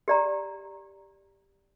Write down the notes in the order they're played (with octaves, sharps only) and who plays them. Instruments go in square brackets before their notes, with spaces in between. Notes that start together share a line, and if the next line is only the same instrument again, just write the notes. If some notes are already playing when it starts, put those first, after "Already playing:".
[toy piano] G4 D5 A#5